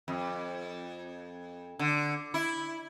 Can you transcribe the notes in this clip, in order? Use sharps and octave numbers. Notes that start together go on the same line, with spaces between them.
F2
D3
E4